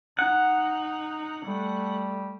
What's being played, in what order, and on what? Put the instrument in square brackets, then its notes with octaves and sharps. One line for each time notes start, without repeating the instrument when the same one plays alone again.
[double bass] D#4 [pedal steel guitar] F#5
[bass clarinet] G3 [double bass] A3